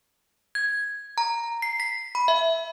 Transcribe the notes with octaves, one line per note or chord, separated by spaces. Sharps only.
G#6
A#5
C7
B6
B5
E5